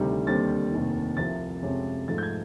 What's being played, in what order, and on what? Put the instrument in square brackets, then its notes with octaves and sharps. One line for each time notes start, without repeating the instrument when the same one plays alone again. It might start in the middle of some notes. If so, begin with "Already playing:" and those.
Already playing: [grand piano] D2 C3 D#3 G3
D#2 D3 G3 C4 A6
F1 D#2 D#3
C2 C3 F3 A6
F2 C3 F3 G#3 C#4
G#2 F3 A3 A6
G6
G#6